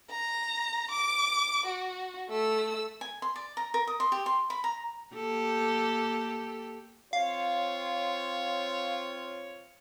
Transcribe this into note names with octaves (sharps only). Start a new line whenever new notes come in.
A#5
D6 D7
F#4
A3 E6
G#5
C6
D5
A#5
A#4
D#6
C6
G4
C6
B5
A#5
A#3 G4 A4
C4 F4 C#5 F5